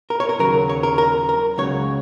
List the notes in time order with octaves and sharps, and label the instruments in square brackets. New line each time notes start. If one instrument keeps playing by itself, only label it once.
[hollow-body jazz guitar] A#4
C#5
A#4
D#2 C#3 F#3 A#4
C#5
A#4
A#4
A#4
C#2 C#3 F#3 C#5